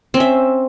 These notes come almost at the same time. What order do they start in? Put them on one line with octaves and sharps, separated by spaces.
C4 C#4 E5